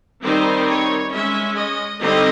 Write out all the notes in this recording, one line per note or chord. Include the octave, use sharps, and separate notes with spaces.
D#3 G3 C4 D#4 C5
C#5
G#3 C#4 E5
D#5
D3 G3 C4 D#4 D#5